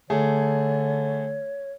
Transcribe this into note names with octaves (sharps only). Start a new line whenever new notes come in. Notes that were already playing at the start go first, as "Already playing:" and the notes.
D3 A3 G#4 C#5